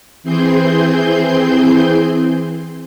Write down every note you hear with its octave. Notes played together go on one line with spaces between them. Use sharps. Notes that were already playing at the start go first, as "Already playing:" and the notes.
E3 C4 G#4 C6 G6